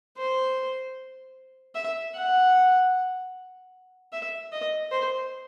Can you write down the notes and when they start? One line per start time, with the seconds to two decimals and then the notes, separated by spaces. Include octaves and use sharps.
0.17 C5
1.75 E5
2.15 F#5
4.13 E5
4.52 D#5
4.91 C5